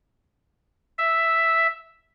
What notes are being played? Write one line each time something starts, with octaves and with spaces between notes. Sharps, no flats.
E5